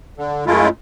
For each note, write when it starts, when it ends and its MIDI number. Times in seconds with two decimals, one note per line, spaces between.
0.17 0.45 50
0.46 0.68 42
0.46 0.68 56
0.46 0.68 57
0.46 0.68 64
0.46 0.68 65